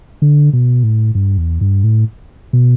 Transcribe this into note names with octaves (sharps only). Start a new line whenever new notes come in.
D3
B2
A2
G2
E2
G2
A2
B2